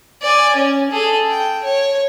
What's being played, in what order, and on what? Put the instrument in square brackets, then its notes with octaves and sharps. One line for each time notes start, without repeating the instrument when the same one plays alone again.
[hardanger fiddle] D5 G#5
C#4
G#4 A4
G5
C#5